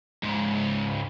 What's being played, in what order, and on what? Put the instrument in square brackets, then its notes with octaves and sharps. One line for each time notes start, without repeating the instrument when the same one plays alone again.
[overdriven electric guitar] C#2 G#2